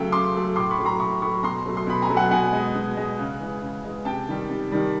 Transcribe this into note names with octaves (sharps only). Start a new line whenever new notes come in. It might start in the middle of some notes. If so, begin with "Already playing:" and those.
Already playing: C#3 F#3 A3 G5
C#3 C6 D6
F#3 A3
A2 C6 D6
B5 C#6
F#3 A3
A#5 C6
A2 B5 C#6
F#3 A3 B5 C#6
B2 A#5 C6
F#3 A3
C6
B2 B5
G#5 A#5
F#3 A3
F#5 G#5
B2 F#5 G#5
G#3
B2
G#3
C#3
E3 G#3
C#3
E3 G#3
C3 G5 A5
D#3 G3
C3
D#3 G3